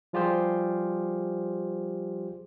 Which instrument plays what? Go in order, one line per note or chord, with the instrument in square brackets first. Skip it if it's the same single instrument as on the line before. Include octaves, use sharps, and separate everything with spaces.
[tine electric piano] F3 G3 F4 G4 G#4 C5